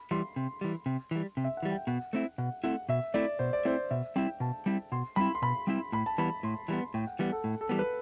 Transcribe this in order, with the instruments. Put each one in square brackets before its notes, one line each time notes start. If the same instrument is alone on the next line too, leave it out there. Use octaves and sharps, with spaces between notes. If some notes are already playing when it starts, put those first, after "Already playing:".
Already playing: [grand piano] B5
[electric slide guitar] E3 G3 [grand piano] C6
[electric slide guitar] C3
E3 G3
C3
E3 G3
C3
[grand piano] E5
F#5
[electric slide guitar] E3 G3
[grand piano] G5
[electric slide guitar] B2 [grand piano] F#5
[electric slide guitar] A3 C4 E4
[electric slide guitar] B2 [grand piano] F#5
[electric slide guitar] A3 C4 E4 [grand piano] F#5
[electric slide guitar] B2 [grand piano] E5
[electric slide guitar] A3 C4 E4 [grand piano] D5
[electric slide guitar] B2 [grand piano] C5
[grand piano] D5
[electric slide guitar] A3 C4 E4 [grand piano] C5
[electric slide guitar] B2 [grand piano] E5
[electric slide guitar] G3 C4 E4 [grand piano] G5
[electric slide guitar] B2 [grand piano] A5
[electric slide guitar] G3 C4 E4
[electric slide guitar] B2 [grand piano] C6
[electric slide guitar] G3 C4 E4 [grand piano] B5
[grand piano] C6
[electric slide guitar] B2 [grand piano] B5
[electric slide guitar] G3 C4 E4
[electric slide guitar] A2 [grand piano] B5
[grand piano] A5
[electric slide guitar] E3 G3 B3 [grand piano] B5
[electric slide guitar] A2 [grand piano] C6
[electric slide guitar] E3 G3 B3 [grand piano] B5
[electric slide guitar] A2 [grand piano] G5
[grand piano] F#5
[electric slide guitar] E3 G3 B3 [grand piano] F#5
[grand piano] A4
[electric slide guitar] A2
[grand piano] A4
[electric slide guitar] E3 G3 B3
[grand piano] B4